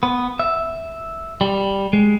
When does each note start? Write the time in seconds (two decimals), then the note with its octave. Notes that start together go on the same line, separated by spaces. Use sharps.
0.03 B3
0.39 E5
1.41 G3
1.93 G#3